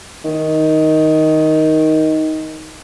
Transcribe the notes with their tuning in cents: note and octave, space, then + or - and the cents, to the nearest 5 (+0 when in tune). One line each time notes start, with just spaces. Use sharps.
D#3 +10